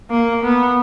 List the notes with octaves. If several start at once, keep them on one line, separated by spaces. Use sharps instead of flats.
A#3
B3